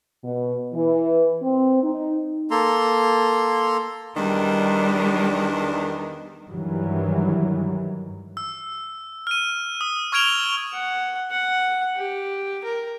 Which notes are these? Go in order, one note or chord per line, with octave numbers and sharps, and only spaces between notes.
B2
E3
C4
D#4
A#3 A4 A#5 C6
E2 D#3 G3 D4
G2 D#3 E3 F#3 G3
E6
F6 D#7
D#6
C#6 F6 G#6 D7 F7 G7
F#5
F#5
G4
A#4